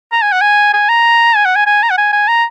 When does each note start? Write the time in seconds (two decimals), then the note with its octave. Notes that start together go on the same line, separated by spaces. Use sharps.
0.12 A#5
0.22 G#5
0.32 F#5
0.41 G#5
0.74 G#5
0.89 A#5
1.36 G#5
1.46 F#5
1.56 G#5
1.67 G#5
1.83 A#5
1.90 F#5
1.98 G#5
2.13 G#5
2.28 A#5